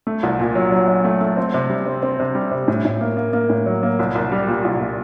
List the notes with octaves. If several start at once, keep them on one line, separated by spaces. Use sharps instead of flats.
A3
C2
A#2
F#3
F#3
F#3
A3
A3
C4
C3
G3
C4
C4
C3
G3
C3
A2
A2
A#3
A#3
A#3
A2
F#3
A#3
C2
C2
G3
A#2
C2
A#2